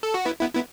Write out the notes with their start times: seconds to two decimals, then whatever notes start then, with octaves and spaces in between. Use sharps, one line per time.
0.03 A4
0.14 F#4
0.25 B3 E4
0.41 B3 E4
0.55 B3 E4